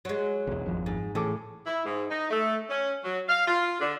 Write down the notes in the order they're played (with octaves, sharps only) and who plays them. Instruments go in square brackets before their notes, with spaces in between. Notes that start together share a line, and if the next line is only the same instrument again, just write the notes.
[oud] F#3 G#3
[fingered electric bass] B1 E2
[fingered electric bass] G#1 F2 [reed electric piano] F3
[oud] G#2
[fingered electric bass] A2 [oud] C#3 [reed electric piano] E3 A4 D6
[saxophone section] E4
G#2
D#4
A3
C#4
F#3
F5
F4
D3